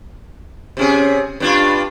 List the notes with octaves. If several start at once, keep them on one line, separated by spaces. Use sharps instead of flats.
C3 C#4 G#4
G2 D4 F4